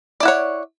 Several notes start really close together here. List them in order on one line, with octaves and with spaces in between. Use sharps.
D5 E4 F#5 C#5